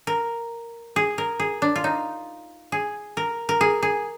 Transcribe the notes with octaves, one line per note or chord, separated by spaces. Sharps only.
A#4
G#4
A#4
G#4
D4
F4
D#4
G#4
A#4
A#4
G#4
G#4